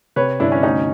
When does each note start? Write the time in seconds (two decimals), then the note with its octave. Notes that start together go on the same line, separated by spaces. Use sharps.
0.16 C3 B4 C#5
0.40 G1 D4 E4
0.52 C#4
0.63 D2 C#4 D#4